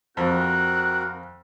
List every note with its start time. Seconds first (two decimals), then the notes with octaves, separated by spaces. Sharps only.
0.17 F2 C4 F#4 A#4 F#6